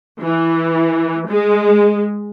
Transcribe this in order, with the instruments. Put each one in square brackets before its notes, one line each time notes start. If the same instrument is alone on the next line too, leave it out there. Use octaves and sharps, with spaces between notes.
[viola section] E3
G#3